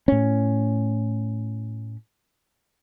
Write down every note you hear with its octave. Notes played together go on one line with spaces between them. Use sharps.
A2 C#4